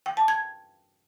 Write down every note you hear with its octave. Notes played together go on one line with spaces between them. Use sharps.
G5
A5
G#6